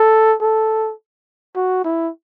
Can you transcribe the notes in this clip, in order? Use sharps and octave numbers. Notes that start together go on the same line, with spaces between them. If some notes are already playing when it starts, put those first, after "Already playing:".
Already playing: A4
A4
F#4
E4